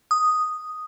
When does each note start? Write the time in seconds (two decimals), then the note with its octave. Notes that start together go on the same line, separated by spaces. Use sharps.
0.11 D#6